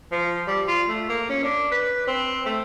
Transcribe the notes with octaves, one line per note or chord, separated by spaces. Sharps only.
F3
G3
F4
A3
A#3
C#4
D4
B4
C4
A3